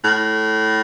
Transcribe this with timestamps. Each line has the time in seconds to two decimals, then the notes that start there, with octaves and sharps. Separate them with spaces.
0.04 A2